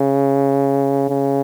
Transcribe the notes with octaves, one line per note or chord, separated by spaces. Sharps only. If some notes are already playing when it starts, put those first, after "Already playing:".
Already playing: C#3
C#3